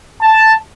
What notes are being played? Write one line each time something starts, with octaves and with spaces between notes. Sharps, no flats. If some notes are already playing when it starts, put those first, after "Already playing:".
A5